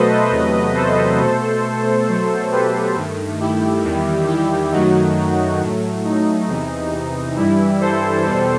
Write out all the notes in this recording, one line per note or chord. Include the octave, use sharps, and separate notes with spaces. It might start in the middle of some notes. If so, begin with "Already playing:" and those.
Already playing: B2 F#3 A3 A4 B4 C5 D#5
E2 C3 F#3 A3
A4 C5
B2 A3
B2 F#3 A3
G4 B4
G2 D#3 A3
E4 G4
E2 D#3 G3
E4 G4
F#2 D#3 F#3 A3 D#4 F#4
A2 F#3 A3
D#4
E2 C3 E3
G2 E3 G3 E4
A4 C5
E2 B2 G3